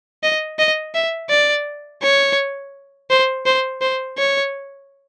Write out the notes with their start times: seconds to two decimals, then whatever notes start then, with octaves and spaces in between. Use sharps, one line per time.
0.23 D#5
0.59 D#5
0.94 E5
1.30 D5
2.02 C#5
3.10 C5
3.46 C5
3.81 C5
4.18 C#5